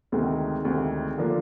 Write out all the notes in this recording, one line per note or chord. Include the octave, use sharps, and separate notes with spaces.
D2 C3 D#3 G#3
D2 C3 D#3 G#3
D3 F3 A#3 D4